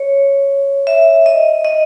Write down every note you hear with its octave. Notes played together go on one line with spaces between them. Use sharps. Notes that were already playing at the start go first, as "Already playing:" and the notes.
Already playing: C#5
E5
D#5
D#5